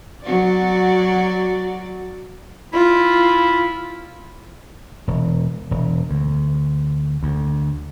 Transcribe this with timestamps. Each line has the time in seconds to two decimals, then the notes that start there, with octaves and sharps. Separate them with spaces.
0.22 F#3 F#4 D5
2.73 E4 F4
5.08 E1
5.71 E1
6.10 D2
7.23 D2